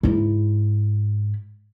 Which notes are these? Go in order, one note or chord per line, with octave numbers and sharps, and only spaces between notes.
G#2 E4